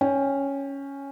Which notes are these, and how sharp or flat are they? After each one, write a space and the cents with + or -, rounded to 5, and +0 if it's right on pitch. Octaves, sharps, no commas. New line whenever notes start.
C#4 +0 G5 +20